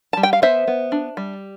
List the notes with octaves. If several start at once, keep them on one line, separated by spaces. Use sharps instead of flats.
G3 A5
G5
F5
B3 C5 E5
B3
D4
G3